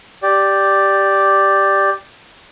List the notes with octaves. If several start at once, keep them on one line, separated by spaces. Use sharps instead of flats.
G4 D5